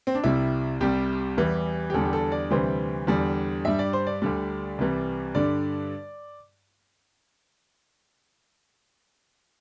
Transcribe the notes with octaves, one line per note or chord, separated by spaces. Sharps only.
C4
D4
C2 C3 G3 E4
C2 C3 G3 G4
E2 E3 G3
G4
E2 D3 G3 A4
G4
A4
D5
D2 C3 E3 G3 C5
E2 D3 G3
G2 G3 E5
D5
C5
D5
D2 D3 G3
C2 C3 E3 G3
G2 D3 G3 D5